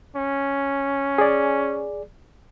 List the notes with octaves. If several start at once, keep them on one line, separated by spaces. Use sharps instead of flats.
C#4
G#4 D5